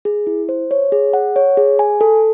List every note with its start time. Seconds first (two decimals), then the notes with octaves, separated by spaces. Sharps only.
0.05 G#4
0.27 E4
0.49 C5
0.71 C#5
0.92 G#4
1.13 F#5
1.36 C#5
1.57 G#4
1.79 G#5
2.01 A4